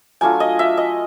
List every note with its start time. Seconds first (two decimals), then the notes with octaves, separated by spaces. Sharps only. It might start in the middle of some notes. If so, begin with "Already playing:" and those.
0.21 F#3 A3 D4 F4 G#5
0.40 D#5
0.59 E5
0.77 D#5